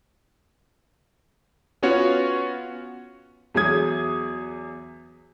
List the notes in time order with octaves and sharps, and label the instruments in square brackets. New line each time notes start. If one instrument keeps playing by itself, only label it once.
[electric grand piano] B3 C#4 F4 F#4 C#5
[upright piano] E2 F#3 G#4 D#6 G#6